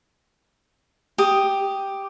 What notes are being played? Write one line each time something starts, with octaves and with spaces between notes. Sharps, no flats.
G4 D#6